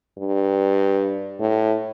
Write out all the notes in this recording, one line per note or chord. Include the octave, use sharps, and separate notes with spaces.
G2
A2